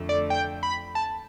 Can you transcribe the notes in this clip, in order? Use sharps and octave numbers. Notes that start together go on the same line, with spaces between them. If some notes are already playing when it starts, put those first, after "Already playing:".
Already playing: F2 D3 A3
D5
G5
B5
A5